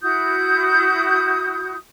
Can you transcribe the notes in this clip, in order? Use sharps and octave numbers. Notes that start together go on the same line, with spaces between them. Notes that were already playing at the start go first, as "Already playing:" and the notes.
E4 F#4 D#6 G6